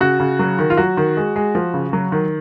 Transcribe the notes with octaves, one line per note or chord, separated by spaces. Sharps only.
C#3 F#4
C#3
F#3
D#3
F4
F#3 F#4
D#3
G#3
G#3
F3
C#3
F#3
D#3